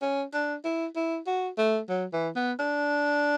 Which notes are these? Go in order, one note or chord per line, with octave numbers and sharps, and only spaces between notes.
C#4
D4
E4
E4
F#4
A3
F#3
E3
B3
D4